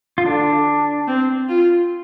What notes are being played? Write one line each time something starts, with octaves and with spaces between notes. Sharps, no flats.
F4
D3 D4
C4
F4